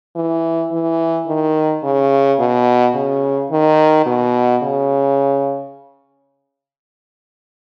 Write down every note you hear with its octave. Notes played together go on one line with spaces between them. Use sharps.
E3
E3
D#3
C#3
B2
C#3
D#3
B2
C#3